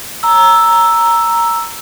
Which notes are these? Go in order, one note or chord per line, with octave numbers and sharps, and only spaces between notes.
A#5 E6